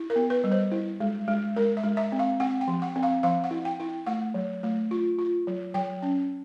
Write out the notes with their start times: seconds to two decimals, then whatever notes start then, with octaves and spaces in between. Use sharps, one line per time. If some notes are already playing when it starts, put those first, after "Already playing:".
Already playing: E4
0.10 A#4
0.16 B3
0.30 B4
0.44 G3
0.52 C5
0.72 E4
1.00 G#3
1.28 G#3
1.56 G#3 A#4
1.77 E5
1.83 G#3
1.97 E5
2.12 C4
2.19 F5
2.40 C4 F#5
2.61 G5
2.68 F3
2.82 F#5
2.96 C4
3.03 F5
3.23 F3 F5
3.44 F#5
3.51 E4
3.65 G5
3.80 E4
4.06 A3 F#5
4.34 F#3
4.63 A3
4.91 F4
5.19 F4
5.47 F#3
5.74 F#3 G5
6.03 C#4